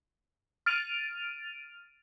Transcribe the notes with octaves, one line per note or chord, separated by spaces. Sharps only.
F6 A6 D7 D#7 F7